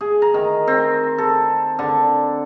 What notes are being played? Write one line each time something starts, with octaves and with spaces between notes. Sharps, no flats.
G#4
A#5
D#3
C4
A4
D3